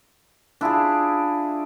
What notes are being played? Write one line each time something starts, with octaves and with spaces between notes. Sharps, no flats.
D4 E4 F4 G#4